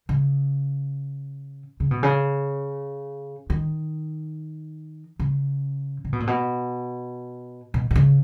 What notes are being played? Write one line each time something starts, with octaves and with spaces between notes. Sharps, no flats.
C#3
C#3
B2
C#3
D#3
C#3
C#3
B2
A#2
B2
B2
B2
C#3